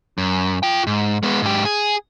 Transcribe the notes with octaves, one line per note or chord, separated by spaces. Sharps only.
F#2
F4 G5
G#2
G#3 B3
G#2 G4
G#4